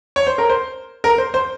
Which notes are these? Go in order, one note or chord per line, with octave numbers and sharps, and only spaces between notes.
C#5
C5
A#4
C5
A#4
C5
C5